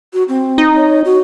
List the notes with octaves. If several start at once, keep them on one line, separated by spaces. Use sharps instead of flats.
F#4
C4
D#4
C#5
F#4